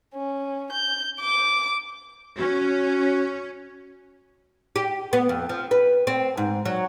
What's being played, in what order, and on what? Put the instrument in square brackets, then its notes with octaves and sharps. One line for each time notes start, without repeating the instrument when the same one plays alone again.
[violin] C#4
G6
D6
[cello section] C#4 [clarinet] F#4
[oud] G4
B3
F2
F3
B4
C4
G#2
F#3